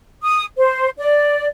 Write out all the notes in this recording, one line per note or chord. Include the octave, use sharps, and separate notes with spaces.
D#6
C5
D5